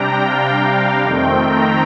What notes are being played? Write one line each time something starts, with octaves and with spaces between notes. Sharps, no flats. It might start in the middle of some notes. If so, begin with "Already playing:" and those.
Already playing: C3 G3 D4 G5 A#5
F5
F2 D#3 A3 C4 G5
A#5